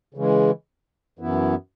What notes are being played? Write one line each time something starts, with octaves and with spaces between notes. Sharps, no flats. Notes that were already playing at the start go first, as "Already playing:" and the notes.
C#3 E3 G#3
F#2 E3 B3 E4